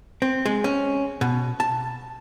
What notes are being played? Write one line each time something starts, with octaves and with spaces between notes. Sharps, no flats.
C4
G#3
C#4
B2
A5